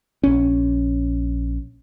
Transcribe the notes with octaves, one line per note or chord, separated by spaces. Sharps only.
A#1 C#4